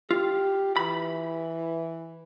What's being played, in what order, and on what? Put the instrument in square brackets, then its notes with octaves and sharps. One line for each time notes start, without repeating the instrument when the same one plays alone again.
[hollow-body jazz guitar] F4 [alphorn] G4
[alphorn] E3 [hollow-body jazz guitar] B5